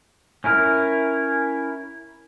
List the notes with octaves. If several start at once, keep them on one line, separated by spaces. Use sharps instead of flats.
C#4 E4 A#4 F6